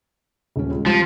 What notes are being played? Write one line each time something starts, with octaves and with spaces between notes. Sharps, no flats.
D#1 C#4
C#2
F3 G3 C4